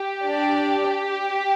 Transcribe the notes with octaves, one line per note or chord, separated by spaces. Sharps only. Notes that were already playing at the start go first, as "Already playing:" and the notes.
Already playing: G4
D4 D5